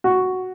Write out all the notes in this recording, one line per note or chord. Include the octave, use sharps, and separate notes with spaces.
F#4